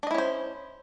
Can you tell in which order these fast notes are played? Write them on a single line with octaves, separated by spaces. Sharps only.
D4 D#5 E4 C#4 C5